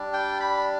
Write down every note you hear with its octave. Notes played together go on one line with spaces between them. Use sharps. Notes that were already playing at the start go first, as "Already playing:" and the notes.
Already playing: G3 D4
G5
B5